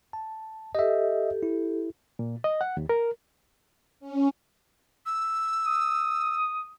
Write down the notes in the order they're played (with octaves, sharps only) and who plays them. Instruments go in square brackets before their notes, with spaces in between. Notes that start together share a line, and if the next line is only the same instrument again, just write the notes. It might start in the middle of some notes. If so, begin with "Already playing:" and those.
[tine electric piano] A5
[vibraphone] G4 A4 [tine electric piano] D#5 E5
[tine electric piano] E4
[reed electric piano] A#2
D#5
F#5
D#2
A#4
[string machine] C#4
[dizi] E6
[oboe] D#6